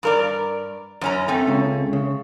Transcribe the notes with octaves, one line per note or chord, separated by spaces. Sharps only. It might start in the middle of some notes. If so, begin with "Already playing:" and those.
G2 A#4 D5
F#2 C#4 A#5
A3 C4
C#2 C#3
C#3